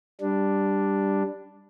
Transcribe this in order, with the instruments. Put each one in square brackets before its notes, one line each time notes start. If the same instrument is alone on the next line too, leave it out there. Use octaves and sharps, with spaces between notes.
[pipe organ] G3 D4